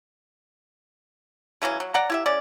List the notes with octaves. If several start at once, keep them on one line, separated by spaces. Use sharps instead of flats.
C#3 E3 F#3 C#4
F#3
D5 F#5 A#5
E4 G4 E5
G#3 C#4 D5